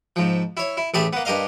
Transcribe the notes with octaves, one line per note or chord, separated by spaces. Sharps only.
G#2 F3
E4 C#5
E4
A1 A3 G4 G#4 A5 B5
A#3 B3
G2 G4 A#4 D#5 F5